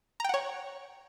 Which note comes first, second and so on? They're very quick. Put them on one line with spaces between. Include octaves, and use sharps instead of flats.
A#5 G5 F#5 C#5